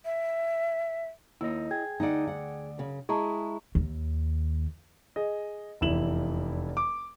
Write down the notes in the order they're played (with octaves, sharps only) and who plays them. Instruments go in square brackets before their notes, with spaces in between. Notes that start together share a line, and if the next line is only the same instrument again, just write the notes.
[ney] E5
[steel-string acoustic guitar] D#2 [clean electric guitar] E4 D#5
[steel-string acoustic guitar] G#4 [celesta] G5 G#6
[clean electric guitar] D2 D5 [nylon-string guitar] D#4 F#5
[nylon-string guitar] F#5
[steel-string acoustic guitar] F#2 C#3
[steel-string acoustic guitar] G#3 E4 [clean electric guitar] G#4 [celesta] A5 A#5 C#6
[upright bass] D#2
[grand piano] G#4 D#5
F1 E2 E4 E7 F#7
D6